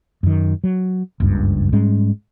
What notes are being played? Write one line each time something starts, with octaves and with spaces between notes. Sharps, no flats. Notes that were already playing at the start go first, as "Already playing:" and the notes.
F#2 D#3
F#3
F#1 C#2 G2
G#2 G3 G#3 C#4